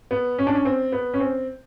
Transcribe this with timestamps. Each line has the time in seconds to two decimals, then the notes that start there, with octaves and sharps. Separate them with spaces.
0.11 B3
0.39 C#4
0.47 D4
0.55 C#4
0.65 C4
0.92 B3
1.14 C#4
1.20 C4